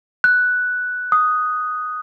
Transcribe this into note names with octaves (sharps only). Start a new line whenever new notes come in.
F#6
D#6